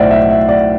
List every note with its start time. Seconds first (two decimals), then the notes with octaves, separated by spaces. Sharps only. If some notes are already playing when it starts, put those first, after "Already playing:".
Already playing: B1 A2 C5 D5 E5 F#5
0.11 E5
0.31 E5
0.49 D5